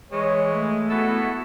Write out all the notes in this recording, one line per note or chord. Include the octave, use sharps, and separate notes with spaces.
E3 G#3 C#5
A3
B3 E4 F#4 A4